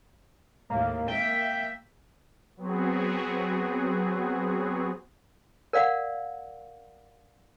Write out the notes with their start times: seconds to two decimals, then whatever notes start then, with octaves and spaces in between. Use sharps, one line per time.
0.70 D#2 A2 A#3
1.08 A#3 E5 G5
2.57 F#3 B3 C4 F#4 G#4
5.73 A#4 D5 F5 F#5